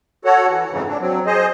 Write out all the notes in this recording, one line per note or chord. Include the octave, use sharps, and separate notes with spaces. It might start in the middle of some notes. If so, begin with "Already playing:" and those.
F#4 A4 C#5 F#5
E3
F2 G#2 C#3 E3
D4
F#3 C4
G#4 C5 D#5